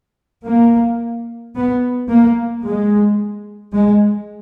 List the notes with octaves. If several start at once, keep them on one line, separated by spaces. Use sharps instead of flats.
A#3
B3
A#3
G#3
G#3